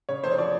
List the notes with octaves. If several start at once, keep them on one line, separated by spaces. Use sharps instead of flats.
C#3 C#5
F1 C5
C#5
F3 D5